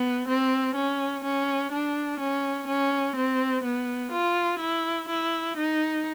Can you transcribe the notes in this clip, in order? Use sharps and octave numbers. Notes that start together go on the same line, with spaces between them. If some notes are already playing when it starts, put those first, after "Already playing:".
Already playing: B3
C4
C#4
C#4
D4
C#4
C#4
C4
B3
F4
E4
E4
D#4